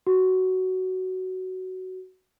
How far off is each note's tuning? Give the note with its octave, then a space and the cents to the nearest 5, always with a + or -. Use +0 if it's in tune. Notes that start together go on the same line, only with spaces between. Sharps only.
F#4 +10